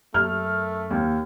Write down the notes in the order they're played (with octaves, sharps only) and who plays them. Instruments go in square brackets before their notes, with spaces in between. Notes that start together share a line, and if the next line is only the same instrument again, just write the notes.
[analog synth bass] F#2 [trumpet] A3 [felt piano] F6
[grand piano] D#2